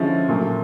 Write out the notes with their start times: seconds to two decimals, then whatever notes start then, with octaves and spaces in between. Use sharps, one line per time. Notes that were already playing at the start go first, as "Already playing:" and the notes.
Already playing: D3 F3 G#3 C#4 E4
0.29 A#2 F#3 A3